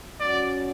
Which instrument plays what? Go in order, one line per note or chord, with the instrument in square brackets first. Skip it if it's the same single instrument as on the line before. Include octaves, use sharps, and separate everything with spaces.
[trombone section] F#3 C#4 F#4 [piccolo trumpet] D5